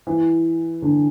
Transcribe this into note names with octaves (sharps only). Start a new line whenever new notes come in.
E3
D3